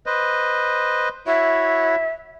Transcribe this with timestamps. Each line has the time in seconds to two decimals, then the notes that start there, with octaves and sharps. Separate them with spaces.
0.06 B4 C5 D#5
1.27 E4 F#4 C#5 E5